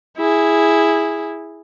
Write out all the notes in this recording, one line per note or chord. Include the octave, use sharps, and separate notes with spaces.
E4 G#4